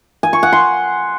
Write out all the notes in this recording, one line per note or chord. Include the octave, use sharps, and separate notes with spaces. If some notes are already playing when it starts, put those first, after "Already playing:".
G#5
C#6
F#5
C6